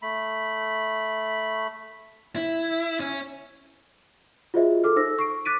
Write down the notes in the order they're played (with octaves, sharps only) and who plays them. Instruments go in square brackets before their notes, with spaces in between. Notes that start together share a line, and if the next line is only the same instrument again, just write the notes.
[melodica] A3 B5
[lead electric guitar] E4
C#4
[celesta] F4 F#4 G#4 C5 D#5 E5
A4 D6 F6
D#4 C5 E6 A#6
C#6 C7 D7
D6 F#6 A6 B6 D7 D#7